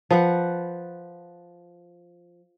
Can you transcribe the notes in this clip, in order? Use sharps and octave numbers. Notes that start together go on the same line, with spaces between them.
F3 B4 F#5